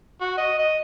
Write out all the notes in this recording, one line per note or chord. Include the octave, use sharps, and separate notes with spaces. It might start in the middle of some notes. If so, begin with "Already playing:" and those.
F#4
D#5
D#5